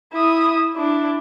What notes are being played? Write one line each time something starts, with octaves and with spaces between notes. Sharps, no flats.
E4 D#6
D4 E4